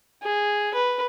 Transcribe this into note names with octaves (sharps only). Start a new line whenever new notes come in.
G#4
B4